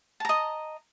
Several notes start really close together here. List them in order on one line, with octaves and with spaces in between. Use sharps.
A5 A#5 D#5